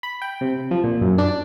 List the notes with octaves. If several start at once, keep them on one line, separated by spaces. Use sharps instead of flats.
B5
G5
C3
F3
A#2
F#2
D4